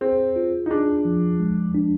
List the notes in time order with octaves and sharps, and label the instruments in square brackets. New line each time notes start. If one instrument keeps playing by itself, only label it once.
[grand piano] C4 [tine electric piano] G#4
[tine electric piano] F4
[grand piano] D#4
[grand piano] D4 [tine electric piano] G#4
[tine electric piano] F3
G#3
D4